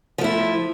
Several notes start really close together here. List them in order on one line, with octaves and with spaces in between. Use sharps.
F3 A3 E4